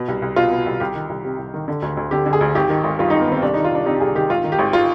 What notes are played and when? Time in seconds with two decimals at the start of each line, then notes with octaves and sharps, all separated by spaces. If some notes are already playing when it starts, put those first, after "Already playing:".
Already playing: B2
0.08 C2
0.22 C2
0.36 B2 F4
0.51 B2
0.66 C2
0.80 C2 G4
0.95 D#3
1.10 C2
1.25 C3
1.39 C2
1.54 D#3
1.68 D3
1.82 D2
1.97 D2
2.11 D3 G4
2.26 D3
2.33 G#4
2.41 D2
2.55 G#1 G4
2.70 D#3
2.84 G#1
2.99 G2 F4
3.10 G#1 D#4
3.21 B3
3.28 D#3 C4
3.42 C2 D4
3.54 D#3 D#4
3.64 F4
3.71 C2 D4
3.86 C3 D#4
3.94 G4
4.00 C2 G#4
4.15 D#3 G4
4.30 G#1 F4
4.44 D#3
4.52 G4
4.59 G#1
4.73 F4